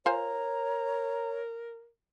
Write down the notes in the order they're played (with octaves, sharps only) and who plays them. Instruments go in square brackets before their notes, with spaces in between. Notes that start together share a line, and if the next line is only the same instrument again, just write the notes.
[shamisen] F4 C5 G#5 [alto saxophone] A#4 [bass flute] C#5 [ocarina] A#5